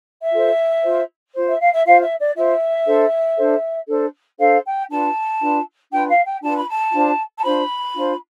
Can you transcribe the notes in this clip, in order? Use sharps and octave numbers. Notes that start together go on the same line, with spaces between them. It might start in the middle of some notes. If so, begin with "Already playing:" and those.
E5
F4 A4 C5
F4 C5
F4 C5
E5
F5
E5
F4 C5 F5
E5
D5
F4 C5 E5
D4 A4 C5
D4 A4 C5
D4 A4 C5
D4 A4 C5 F5
G5
D4 F4 B4 A5
D4 F4 B4
D4 F4 B4 G5
F5
G5
D4 F4 B4 A5
B5
A5
D4 F4 C5
A5
D4 F4 C5 B5
D4 F4 C5